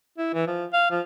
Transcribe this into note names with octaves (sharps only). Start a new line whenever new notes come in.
E4
E3
F3
F5
F3